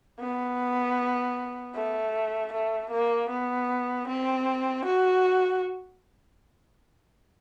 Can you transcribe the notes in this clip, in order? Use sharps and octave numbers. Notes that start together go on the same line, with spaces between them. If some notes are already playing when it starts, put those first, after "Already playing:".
B3
A3
A3
A#3
B3
C4
F#4